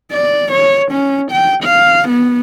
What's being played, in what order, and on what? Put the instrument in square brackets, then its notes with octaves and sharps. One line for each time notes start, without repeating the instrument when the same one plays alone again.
[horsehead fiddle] D5
C#5
C#4
G5
F5
B3